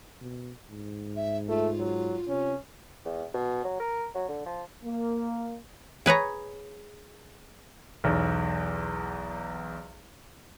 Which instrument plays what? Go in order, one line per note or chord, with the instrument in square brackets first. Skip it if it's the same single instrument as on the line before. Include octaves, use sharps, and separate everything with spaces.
[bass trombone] B2
G#2
[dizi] E5
[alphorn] A3 [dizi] F4
[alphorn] F#3
[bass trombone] C3 [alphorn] C#4
[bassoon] E2
B2
F#3
A#4
F#3
D3
F3
[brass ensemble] A#3
[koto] G#4 B4 C#5 A#5
[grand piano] B1 E2